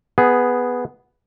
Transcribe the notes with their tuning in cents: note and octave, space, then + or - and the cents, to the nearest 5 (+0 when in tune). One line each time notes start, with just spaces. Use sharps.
B3 +0 G#4 +0